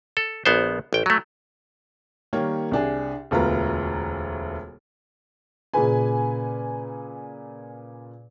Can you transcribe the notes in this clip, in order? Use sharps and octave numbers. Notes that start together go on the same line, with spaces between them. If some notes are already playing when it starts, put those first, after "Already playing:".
A4
A#1 B3 C5
A1 G5
F#3 A3
D#3 G3 A#3 C#5
C2 D4 G#4
E1 D2 F4 B4 A#5
A#2 C#3 B4 G#5